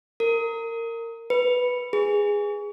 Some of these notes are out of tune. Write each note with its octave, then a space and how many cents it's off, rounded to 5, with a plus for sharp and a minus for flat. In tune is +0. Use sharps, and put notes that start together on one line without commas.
A#4 -20
B4 +0
G#4 -10